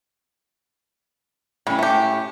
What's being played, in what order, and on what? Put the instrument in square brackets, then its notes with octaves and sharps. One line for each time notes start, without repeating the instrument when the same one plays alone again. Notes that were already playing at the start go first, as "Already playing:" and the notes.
[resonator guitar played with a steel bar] A2 C#4 [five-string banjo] G3
[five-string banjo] A3 G4